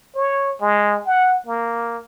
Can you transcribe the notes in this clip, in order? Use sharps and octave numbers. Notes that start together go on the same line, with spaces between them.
C#5
G#3
F#5
A#3